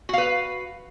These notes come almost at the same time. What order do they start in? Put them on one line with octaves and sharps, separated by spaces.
F#4 F5 B4